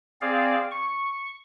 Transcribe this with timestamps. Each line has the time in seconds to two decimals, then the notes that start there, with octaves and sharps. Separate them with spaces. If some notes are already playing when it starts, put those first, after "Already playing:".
0.21 C4 G#4 D5 F5
0.71 C#6